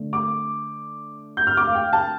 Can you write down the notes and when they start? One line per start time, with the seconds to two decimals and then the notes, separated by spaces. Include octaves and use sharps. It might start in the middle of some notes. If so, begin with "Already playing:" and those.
Already playing: D3 A3 D4
0.13 D6
1.37 G6
1.47 F6
1.57 D6
1.67 F5
1.75 G5
1.93 A5